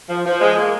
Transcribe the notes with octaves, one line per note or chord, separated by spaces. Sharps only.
F3
F3
G#3
A#3